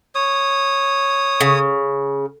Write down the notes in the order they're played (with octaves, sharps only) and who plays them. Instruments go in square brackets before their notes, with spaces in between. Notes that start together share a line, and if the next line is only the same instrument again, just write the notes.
[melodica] C#5 D#6
[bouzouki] C#3